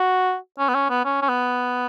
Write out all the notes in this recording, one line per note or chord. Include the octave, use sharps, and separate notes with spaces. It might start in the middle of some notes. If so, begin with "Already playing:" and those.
Already playing: F#4
C#4
B3
C#4
B3
C#4
C#4
B3